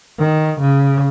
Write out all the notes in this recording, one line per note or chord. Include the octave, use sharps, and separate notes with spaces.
D#3
C#3